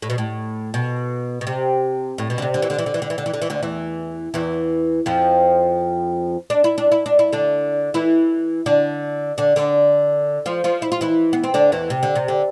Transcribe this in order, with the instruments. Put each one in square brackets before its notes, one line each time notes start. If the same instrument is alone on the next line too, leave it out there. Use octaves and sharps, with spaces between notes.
[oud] A2
B2
A2
B2
B2
C3
A2
B2
D3
C3
D3
E3
D3
E3
D3
E3
D3
E3
D3
E3
D3
E3
D2 D3
E2 E3
E2 E3
F2 F3
D4
E4
D4
E4
D4
E4
D3 D4
E3 E4
D3 D4
D3 D4
D3 D4
F3 F4
F3 F4
E4
F4
E3 E4
B3
C4
D3 D4
E2 E3
C3
D3
C3
D3